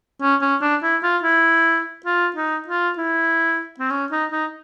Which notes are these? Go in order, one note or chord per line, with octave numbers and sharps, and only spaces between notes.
C#4
C#4
D4
E4
F4
E4
F4
D#4
F4
E4
C4
C#4
D#4
D#4